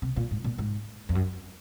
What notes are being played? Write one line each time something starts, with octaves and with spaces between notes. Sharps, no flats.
C3
A#2
G#2
A#2
G#2
F2
F#2